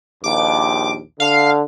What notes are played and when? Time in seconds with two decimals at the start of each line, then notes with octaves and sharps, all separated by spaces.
0.24 A#1 D#2 D6
1.20 D3 F5